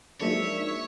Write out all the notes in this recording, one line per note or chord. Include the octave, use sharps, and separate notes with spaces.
F3 F#3 G#3 A#3 D4 D#4 C#5 E5